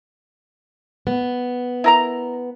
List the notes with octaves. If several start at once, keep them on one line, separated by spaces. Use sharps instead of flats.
B3
E4 A#4 A#5